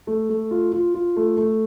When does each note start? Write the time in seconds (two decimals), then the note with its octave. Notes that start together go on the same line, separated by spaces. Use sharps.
0.07 A3
0.29 A3
0.51 F4
0.73 F4
0.94 F4
1.16 A3
1.37 A3